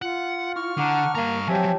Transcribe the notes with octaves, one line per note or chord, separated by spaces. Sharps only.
F4 F#5
E4 C#6 F6
D3 F#5 A5 A#5 D6
G2 A#3 F5 G5 A#5 A#6
F3 F#3 C4 G4 C#5 E5 G#5 A5